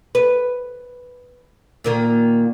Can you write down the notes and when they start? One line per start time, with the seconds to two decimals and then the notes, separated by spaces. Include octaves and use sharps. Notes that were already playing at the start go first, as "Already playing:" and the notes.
0.15 B4
1.84 A#2 D#3 A#3